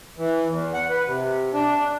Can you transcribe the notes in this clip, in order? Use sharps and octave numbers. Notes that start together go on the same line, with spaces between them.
E3
E2
F#5
B4
C3
D4